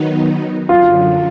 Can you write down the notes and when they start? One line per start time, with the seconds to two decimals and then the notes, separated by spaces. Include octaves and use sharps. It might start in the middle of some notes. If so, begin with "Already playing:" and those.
Already playing: D#3 F#3 B3 D#4
0.69 F#2 D3 F#3 F4